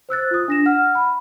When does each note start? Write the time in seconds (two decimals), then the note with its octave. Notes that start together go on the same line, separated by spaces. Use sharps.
0.09 C5 E6 F#6 A6
0.31 F4 D#6
0.48 D4 A#6 E7
0.66 F#5 F6
0.95 B5